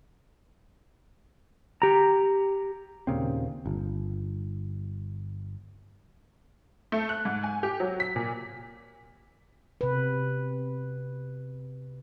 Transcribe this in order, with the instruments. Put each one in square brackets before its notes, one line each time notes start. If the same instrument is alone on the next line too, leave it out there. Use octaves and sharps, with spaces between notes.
[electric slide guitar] G4 A#5
[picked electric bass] D#2 A#2 C#3 C4
G1
[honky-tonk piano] A3
F#6
G#2
G#5
G4
F#3
B6
A#2
[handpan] C3 B4